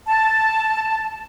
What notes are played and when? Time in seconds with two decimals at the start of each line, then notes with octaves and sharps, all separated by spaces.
0.07 A5